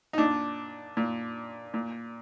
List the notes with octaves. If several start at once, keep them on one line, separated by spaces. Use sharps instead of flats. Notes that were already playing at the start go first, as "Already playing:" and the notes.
D#4
A#2 D4
A#2
A#2